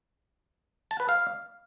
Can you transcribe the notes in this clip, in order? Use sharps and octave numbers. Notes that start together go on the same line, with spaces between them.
A5
B4
F5